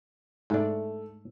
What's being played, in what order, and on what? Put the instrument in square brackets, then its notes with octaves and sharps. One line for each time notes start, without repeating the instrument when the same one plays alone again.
[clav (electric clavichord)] G#2 D4 [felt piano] A3